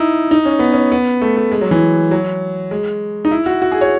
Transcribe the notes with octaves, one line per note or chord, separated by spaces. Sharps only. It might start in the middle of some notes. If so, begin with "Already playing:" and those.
Already playing: D#4 E4
D#4
C#4
B3
C#4
B3
A3
A3
G#3
F#3
E3
F#3
G#3
D#4
E4
F#4
F#4
G#4
C#5